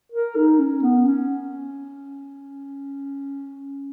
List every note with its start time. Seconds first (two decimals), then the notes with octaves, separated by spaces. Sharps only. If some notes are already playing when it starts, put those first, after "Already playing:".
0.12 A#4
0.36 D#4
0.59 C#4
0.82 B3
1.06 C#4